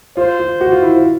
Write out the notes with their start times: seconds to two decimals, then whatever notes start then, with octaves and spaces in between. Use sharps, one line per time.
0.17 F4 C5
0.39 F4
0.61 F#4
0.72 F4
0.83 E4
0.93 F4